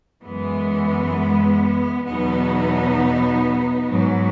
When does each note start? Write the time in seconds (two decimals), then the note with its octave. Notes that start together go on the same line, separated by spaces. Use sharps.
0.24 F#2 E3 G#3 B3
2.07 E2 B2 F#3 B3 D#4
3.89 G#2 F#3